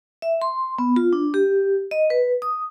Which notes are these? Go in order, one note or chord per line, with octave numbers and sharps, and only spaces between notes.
E5
C6
B3
F4
D4
G4
D#5
B4
D#6